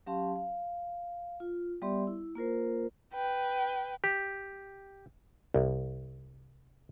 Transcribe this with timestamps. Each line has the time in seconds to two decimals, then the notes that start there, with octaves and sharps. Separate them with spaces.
0.06 F#3 C#4 G4 F5 A5 C6
0.36 F5
1.40 F4
1.82 G3 B3 G4 D5 E5 C6
2.07 E4
2.35 A#3 F4 A#4 C5
3.13 B4 G5
4.04 G4
5.54 C2